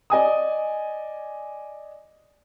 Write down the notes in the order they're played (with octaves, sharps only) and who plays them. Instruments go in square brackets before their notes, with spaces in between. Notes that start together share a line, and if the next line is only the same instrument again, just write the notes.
[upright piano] D5 D#5 G#5 D#6